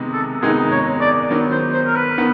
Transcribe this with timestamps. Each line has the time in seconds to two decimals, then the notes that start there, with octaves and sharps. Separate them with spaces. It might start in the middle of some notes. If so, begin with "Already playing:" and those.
Already playing: C3 D#3 G#3 B3 D#4
0.13 A4
0.42 C3 D#3 G#3 B3 D#4 G#4
0.71 C#5
1.01 D5
1.30 D#3 F#3 B3
1.52 C5
1.74 C5
1.87 A#4
1.96 B4
2.18 D#3 B3